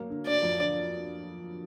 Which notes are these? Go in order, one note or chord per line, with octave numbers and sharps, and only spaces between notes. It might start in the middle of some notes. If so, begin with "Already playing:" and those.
Already playing: F#3 A#3
D3
D3 D5
F2
D3